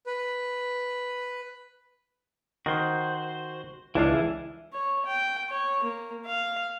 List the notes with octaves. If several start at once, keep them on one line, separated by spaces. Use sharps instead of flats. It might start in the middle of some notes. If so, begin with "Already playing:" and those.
B4
D#3 F#4 C5
C#2 E3 D4 E4 F5
C#5
G5
C#5
A#3
F5